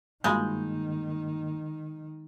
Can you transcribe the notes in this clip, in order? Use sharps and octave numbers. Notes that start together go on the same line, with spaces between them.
G2 D#3 G#3 A#3 F4 F#4 B5 G6